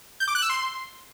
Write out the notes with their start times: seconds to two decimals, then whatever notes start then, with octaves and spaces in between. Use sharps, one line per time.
0.20 G6
0.28 D6
0.35 F#6
0.42 E6
0.50 C6